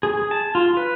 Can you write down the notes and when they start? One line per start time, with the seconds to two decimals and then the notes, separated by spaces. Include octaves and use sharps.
0.03 G#4
0.31 A5
0.55 F4
0.77 B4